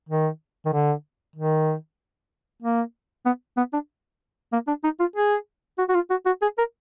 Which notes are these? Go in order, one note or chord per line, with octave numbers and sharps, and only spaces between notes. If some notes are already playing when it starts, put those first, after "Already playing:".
D#3
D#3
D3
D#3
A#3
B3
B3
D4
A#3
D4
D#4
F4
G#4
F#4
F#4
F4
F#4
F#4
G#4
A#4